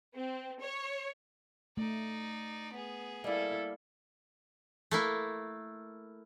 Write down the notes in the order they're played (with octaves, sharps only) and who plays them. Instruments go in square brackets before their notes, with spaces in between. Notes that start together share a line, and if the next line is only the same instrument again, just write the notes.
[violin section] C4
C#5
[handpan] A3 [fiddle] D#4 D5
[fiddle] B3 G#4
[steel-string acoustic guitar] G3 A#3 [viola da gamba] E4 A4
[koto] A3 A#3 E4